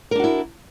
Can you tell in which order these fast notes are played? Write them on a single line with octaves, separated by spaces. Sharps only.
A#4 D4 F#4 E4